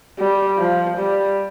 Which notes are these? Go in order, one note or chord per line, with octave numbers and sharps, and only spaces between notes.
G3
F3
G3